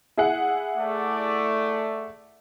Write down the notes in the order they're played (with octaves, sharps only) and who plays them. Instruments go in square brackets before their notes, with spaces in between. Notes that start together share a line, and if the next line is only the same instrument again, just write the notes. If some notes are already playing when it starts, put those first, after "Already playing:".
[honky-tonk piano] E4 G#4 F#5
[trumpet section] A3 D5